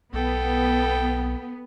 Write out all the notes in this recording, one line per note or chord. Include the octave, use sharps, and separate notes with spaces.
B1 B3 A4 G5